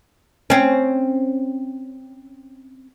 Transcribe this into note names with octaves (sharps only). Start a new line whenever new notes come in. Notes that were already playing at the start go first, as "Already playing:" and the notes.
C4 C#4